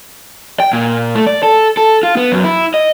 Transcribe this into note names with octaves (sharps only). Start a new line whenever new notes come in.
G5
A#2
A3
D5
A4
A4
F4
B3
F#2
E4
D#5